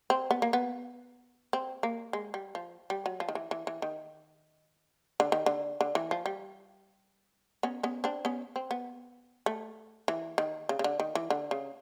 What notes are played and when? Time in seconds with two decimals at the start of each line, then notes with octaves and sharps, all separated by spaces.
0.10 C4
0.31 B3
0.42 A#3
0.53 B3
1.53 C4
1.83 A#3
2.13 G#3
2.34 G3
2.55 F3
2.90 G3
3.06 F#3
3.20 F3
3.29 D#3
3.35 E3
3.51 E3
3.67 E3
3.82 D#3
5.20 D3
5.32 D#3
5.46 D3
5.81 D3
5.95 E3
6.11 F3
6.26 G3
7.63 B3 C#4
7.83 B3 C#4
8.04 C4 D4
8.25 B3 C#4
8.56 C4
8.71 B3
9.46 A3
10.08 E3
10.38 D#3
10.69 C#3
10.79 C#3
10.84 D3
11.00 D#3
11.15 E3
11.30 D3
11.51 C#3